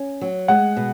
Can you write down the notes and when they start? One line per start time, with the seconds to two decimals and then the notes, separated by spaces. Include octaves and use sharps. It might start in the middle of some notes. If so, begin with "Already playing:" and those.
Already playing: C#4
0.21 F#3
0.48 G#3 F#5
0.76 B2